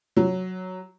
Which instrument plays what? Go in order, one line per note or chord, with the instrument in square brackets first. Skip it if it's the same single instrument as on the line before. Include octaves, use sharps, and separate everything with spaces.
[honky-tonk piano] F#3